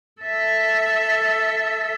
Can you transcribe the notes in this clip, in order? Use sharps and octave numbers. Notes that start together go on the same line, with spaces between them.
A4 E5